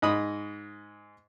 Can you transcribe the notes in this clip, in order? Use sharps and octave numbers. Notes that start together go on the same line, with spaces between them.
G#2 D#5 B5 D#6